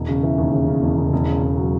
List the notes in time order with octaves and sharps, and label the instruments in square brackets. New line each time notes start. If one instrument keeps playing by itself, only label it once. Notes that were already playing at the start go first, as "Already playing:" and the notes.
Already playing: [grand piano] E1
C#3
E3
D#2
C#3
C#3
E1
C#3
E1
C#3
E1
F#3